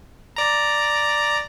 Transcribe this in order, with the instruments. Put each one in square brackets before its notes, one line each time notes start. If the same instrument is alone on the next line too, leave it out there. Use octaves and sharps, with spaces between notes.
[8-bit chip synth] D5 A#5